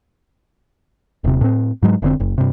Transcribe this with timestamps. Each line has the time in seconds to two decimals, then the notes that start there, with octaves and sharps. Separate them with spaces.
1.24 D#1 C3
1.41 A2 C4
1.82 G#2 F#3 G#3
2.02 F1 D3 C4
2.20 F#1
2.38 G2 C3